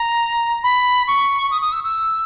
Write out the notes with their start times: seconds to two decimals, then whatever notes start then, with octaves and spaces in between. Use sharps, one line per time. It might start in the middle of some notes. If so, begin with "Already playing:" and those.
Already playing: A#5
0.64 B5
1.07 C#6
1.51 D#6
1.61 D#6
1.72 E6
1.84 E6